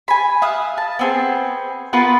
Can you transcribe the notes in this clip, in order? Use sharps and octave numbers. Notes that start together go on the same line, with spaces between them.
G#5 B5
E5 F5 D#6 F#6
A5
B3 C4 G#4
B3 F4 A#4 B4